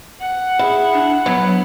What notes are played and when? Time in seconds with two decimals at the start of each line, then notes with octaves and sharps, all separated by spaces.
0.20 F#5
0.59 E4 G#4
0.94 D4
1.26 F#3 B3